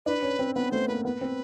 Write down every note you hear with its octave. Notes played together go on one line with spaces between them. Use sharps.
D4 B4
C#4
C4
B3 B4
A3 C5
A#3 B4
B3 B4
C4